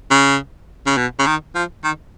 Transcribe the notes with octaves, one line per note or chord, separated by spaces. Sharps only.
C#3
C#3
B2
C#3
D#3
F3
D#3